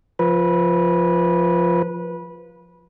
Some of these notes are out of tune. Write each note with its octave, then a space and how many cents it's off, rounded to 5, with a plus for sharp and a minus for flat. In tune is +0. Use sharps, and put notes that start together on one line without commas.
F3 +0 B4 -20